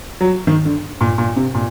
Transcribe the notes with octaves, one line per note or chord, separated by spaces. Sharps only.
F#3
D#3
D3
A#2
A#2
C3
A#2